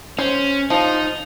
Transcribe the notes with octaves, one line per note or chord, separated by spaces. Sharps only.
C#4 C5
F3 D#4 F4